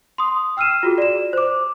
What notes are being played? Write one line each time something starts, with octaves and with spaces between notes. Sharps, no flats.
C6 D#6
G5 E6 F6 C7 D#7 E7
F4 F#4 G#4
D5 E7
C5 D6